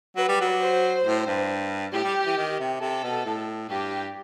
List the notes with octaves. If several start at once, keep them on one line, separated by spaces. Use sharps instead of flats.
F#3 B4
G3
F#3
C5
A2
G2
A2 G4
G3
E3
D#3
C3
C3 A4
B2
A2
G2 G4